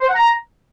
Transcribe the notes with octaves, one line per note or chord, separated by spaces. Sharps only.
C5
F#5
A#5